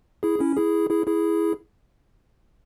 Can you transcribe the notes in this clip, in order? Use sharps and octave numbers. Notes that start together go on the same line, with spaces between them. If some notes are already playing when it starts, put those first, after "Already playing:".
E4 G#4
C#4 E4
E4 G#4
E4 G#4
E4 G#4